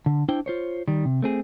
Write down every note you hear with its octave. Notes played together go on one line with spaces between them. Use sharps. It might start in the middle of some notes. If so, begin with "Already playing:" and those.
D3
D4 E4 C5 G5
F4 C5 C#5
D#3 G3
C3
A3 C4 G#4